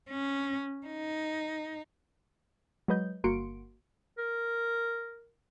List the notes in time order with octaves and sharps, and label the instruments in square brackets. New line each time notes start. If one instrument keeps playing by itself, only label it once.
[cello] C#4
D#4
[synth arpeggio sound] F#3 G#3 B4 D#5 G6
G1 A#3 F#4 C6 C#7 D7
[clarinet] A#4